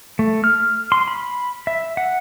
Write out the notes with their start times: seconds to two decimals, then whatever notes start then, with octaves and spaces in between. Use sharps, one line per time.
0.19 A3
0.44 F6
0.92 C6
1.08 B5
1.67 E5
1.97 F#5